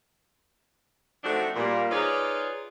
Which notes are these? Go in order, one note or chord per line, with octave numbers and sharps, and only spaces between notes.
F3 A3 C4 D4 D#4 F#4
A#2 G3 A#3
D#4 F4 G#4 B4 C#5 D5